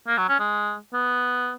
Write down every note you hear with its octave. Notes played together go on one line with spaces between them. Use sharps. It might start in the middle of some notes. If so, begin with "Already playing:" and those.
A#3
F#3
C#4
G#3
B3